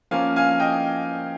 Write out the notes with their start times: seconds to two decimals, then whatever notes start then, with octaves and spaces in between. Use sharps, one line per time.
0.11 F3 A#3 C#4 F5 G#5
0.36 F5 G#5
0.60 D#5 G5